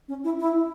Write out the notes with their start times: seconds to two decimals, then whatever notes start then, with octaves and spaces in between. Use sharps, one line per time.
0.08 C#4
0.24 E4
0.40 E4